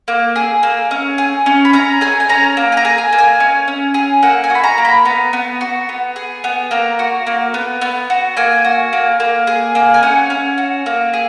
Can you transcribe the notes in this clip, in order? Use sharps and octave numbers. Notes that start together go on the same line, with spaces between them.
A#3
G#4
A#3
C#4
G#4
C#4
B5
C#4 A#5
G#4 G#5
G#5
C#4 A#5
A#3
G#5
A#5
G#4
G#5
A#3
G#5
C#4
C#4
G#4
A#3 F#5
G#5
F#4
B5
A#5
A#3
B5
B3 A#5
B3
F#4
B3
G#4
B3
A#3 A#5
F#4
A#3
B3
B3
F#4
A#3 G#5
F#4
A#3
A#3
G#4
A#3
G#5
C#4 F#5
C#4
F#4
A#3
G#4